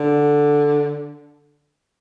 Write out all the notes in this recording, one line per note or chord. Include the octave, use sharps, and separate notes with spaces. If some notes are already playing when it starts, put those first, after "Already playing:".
Already playing: D3